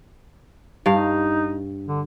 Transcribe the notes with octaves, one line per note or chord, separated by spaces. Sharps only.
G2 D#4 F5
D3